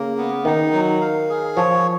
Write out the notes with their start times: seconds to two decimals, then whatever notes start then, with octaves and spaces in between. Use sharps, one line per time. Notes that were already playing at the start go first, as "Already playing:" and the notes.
Already playing: C#3 A#3
0.18 B3
0.45 D#3 D#4
0.73 F#3
1.01 F5
1.30 G#4
1.56 F3 C#5